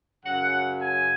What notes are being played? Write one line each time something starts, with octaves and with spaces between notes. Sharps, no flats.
F#2 C#3 F#3 F#5
G#5